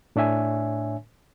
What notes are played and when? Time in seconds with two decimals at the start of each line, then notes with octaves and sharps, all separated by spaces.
0.16 A2 D4 C#5 E5 G#5